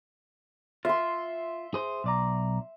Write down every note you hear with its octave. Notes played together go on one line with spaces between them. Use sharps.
F4 E5 C6
G#4 C5
B1 D5 A#5